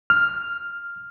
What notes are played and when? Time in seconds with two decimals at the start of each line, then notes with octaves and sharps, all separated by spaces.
0.10 F6